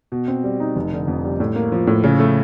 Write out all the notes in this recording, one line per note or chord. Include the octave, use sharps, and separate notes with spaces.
B2
C4
G3
D#4
F1
D3
F2
G3
A2
A#3
F3
A2
C#3
A3